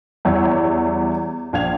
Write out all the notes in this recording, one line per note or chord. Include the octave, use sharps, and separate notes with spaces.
E2 E3 G3 C#5 F#5 E6
A#1 F5 G#6 F7